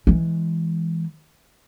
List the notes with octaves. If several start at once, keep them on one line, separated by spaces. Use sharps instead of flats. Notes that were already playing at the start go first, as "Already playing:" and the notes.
E3 G#3